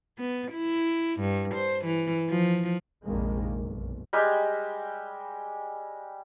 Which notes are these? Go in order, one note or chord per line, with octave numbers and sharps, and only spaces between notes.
B3
E4
G2
C5
E3
F3
A#1 F2 C3 D#3 G#3 A#3
F#1 B1
G3 G#3 G4